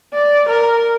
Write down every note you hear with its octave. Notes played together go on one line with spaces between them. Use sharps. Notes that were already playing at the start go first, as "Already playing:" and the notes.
D5
A#4